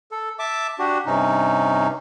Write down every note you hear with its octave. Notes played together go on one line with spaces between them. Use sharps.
A4
E5 A5 D6
D4 F#4 G4
G2 C3 C#4 D#4